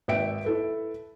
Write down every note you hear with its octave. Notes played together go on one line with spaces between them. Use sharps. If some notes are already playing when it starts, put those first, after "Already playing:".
G#1 B4 E5 G5 D7
E4 A4 B4